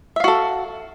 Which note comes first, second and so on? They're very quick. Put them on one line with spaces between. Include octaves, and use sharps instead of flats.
E5 F5 F#4 A4